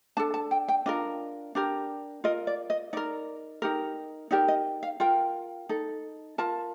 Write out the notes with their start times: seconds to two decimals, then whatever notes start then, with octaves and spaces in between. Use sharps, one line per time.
0.17 D4 A4 A5
0.34 A5
0.51 G5
0.68 G5
0.86 D4 F4 A#4 D#5
1.55 D4 G4 A#4
2.24 F4 A#4 D#5
2.47 D5
2.70 D#5
2.93 D#4 A#4 D5
3.62 D#4 G4 A#4
4.31 D#4 G4 A#4 D5
4.48 D#5
4.83 F5
5.00 F4 A#4 G5
5.69 D#4 A4
6.38 F4 A#4 A5